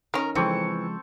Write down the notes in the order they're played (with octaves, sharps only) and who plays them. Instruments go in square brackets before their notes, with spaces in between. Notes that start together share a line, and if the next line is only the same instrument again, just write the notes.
[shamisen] D#3 C#4 [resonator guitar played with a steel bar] A#4
[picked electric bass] C#3 F3 G#3 [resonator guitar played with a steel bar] E3 [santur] C4 A4 C#6